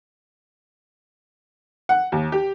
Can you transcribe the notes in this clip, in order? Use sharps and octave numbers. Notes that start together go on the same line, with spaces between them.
F#5
D#2
G4